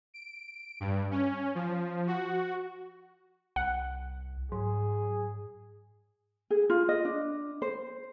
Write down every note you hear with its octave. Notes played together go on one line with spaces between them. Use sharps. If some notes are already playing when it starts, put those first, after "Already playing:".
D7
G2
C#4
F3
F#4
C2 F#5
G#2 F#3 G#4
G#4
F4
D#5
D4
C5